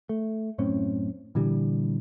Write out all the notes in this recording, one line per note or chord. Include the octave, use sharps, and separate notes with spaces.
A3
F#2 A2 C4 C#4
A#2 D3 E3 G3